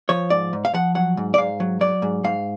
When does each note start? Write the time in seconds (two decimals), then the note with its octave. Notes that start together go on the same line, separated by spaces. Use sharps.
0.09 F3 C#5
0.30 G#2 D5
0.53 G#2
0.65 F5
0.74 F3 F#5
0.95 F#3 F#5
1.17 G#2
1.34 D5
1.38 G#2 F5
1.60 F#3
1.81 F#3 D5
2.02 G#2
2.24 G#2 F5